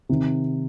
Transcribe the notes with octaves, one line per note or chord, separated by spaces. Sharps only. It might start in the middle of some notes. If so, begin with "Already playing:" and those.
C3 D#3